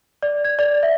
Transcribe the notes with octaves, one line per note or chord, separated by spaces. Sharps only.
D5
G#6
D5
E5